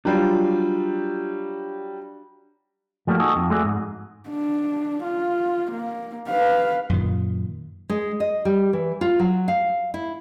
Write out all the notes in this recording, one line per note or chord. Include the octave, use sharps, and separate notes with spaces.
F#3 G3 D4 F4
F3 G3 A3 A#3 F#4
D#4 F#4 G#4 A4
F2
G#3 A3 F#4 G#4 D5
G#2
D4
F4
A#3
B4 F5
F#2 A#2 D#3
G#3
D#5
G3
E3
F4
F#3
F5
E4